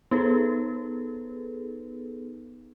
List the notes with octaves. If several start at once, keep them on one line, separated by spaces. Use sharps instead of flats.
B3 D#4 G#4 A4 B4